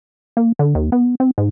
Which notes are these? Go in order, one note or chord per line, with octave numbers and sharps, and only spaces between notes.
A#3
D3
D#2
B3
C4
G#2